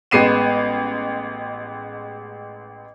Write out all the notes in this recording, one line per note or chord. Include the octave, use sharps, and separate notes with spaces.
A1 G#3 B3 C7 D#7 E7